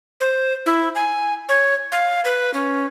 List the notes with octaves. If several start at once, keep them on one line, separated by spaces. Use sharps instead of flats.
C5
E4
G#5
C#5
F5
B4
C#4